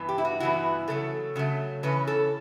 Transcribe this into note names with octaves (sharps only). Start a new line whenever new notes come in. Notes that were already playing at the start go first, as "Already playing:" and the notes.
Already playing: G2 E3 B3
G4
E4
F#4
G2 E3 B3 E4 F#4
C#3 F#3 A3 A4
C#3 F#3 A3
C#3 E3 C#4 B4
A4